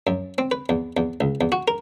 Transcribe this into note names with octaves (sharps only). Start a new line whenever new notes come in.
F#2
C4
B4
E2
E2
C#2
E2
F#4
A#4